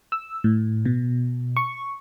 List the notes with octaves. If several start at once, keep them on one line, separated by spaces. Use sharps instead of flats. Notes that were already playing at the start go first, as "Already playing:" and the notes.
E6
A2
B2
C#6